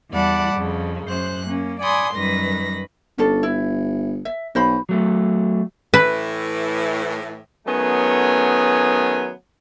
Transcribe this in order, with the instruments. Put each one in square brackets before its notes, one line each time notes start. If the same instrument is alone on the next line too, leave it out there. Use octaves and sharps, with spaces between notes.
[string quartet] E2 G3 D5 F#5 A5 B5
F2 C#3
F#2 C5 F#6
A#3 C#4
D5 F#5 G#5 B5 C6 D#6
F#2 D#3 G3 B4 A#6
[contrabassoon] G1 [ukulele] C#4 D4 A4
[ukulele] E4
E5
[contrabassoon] B1 [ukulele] F#4 C5 B5
[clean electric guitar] F#3 A3
[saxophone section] A2 E3 [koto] B4
[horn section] D#3 F#3 A3 B3 C#4 G#4